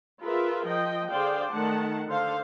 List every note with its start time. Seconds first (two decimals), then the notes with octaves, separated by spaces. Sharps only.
0.21 F4 G#4 A#4 B4 E5
0.66 F3 D#5 G5
1.09 D3 G#4 C5 D5 F5 G5
1.51 D#3 A3 F#5 A5
2.07 D3 A4 C5 F5